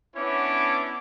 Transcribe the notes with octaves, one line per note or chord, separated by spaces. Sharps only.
B3 C#4 D4 E4 C#5 D6